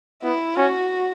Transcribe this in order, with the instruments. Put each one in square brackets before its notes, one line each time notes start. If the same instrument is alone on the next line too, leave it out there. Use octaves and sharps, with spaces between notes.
[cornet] B3 [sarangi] E4
[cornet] C#4 [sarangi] F#4